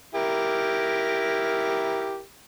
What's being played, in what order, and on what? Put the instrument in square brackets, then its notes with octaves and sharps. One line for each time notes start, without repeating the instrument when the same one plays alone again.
[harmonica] E4 G4 A#4